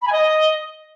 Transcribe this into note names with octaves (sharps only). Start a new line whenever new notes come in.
B5
G#5
D#5